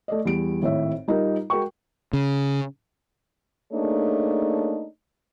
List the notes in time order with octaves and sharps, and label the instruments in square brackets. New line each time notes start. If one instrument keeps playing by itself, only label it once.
[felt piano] A3 D5 D#5
E2 G3 D7
G#1 A2 C#5 E5
G3 D#4 F4 A#4
G#3 F#4 A#4 G5 C#6
[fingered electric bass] C#3
[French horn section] A3 A#3 D4 D#4 G#4 C#5